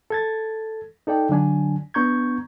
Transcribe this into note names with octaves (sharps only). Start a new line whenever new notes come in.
A4 G#6 A6
D#4 A4 D5 G5
D3 F#3 D4 G#5
B3 D4 A#5 C#6 G6 G#6